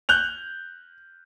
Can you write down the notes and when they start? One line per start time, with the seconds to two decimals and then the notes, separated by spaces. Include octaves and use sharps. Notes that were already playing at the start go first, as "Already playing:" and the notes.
0.09 F#6 G6 F7